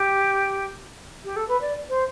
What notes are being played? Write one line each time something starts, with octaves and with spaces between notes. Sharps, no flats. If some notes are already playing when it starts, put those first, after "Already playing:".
Already playing: G4
G4
A4
B4
D5
C5